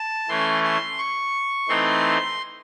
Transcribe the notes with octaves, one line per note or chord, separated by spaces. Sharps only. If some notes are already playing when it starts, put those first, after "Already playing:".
Already playing: A5
E3 A3 C#4 C6
C6
C#6
E3 A3 C4 D#4 C6